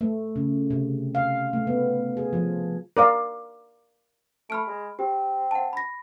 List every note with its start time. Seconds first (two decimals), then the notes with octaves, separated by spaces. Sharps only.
0.01 A3
0.36 C#3
0.70 C3
1.15 F5
1.53 A3
1.67 B3
2.17 G#4
2.33 F3
2.97 A#4 D5 F5
4.50 A3 B5 F6 D7
4.68 G#3
4.99 C4 G4
5.51 F#5 A5
5.73 B5 A#6